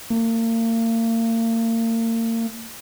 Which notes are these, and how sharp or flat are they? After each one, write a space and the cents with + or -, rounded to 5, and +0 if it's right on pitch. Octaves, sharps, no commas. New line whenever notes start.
A#3 -40